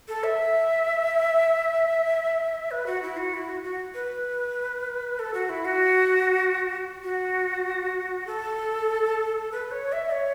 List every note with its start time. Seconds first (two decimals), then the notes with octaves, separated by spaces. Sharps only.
0.08 A4
0.23 E5
2.71 B4
2.86 F#4
3.02 E4
3.17 F#4
3.34 E4
3.49 F#4
3.63 F#4
3.94 B4
5.19 A4
5.34 F#4
5.49 E4
5.65 F#4
7.03 F#4
8.27 A4
9.51 B4
9.71 C#5
9.92 E5
10.13 C#5